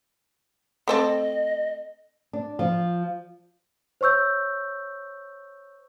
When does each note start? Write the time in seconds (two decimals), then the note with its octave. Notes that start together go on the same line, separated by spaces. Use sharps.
0.88 A3 C4 A4 D#5
2.33 D4
2.59 F3
4.01 C5 C#5 C#6 E6 G6